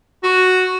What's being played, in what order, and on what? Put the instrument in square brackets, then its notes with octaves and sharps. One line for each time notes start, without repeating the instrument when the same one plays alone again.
[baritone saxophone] F#4